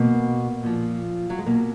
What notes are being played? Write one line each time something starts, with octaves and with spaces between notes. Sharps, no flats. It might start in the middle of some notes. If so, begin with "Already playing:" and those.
Already playing: B2 A#3
A#2 F3
F#3
G#3
B2 A#3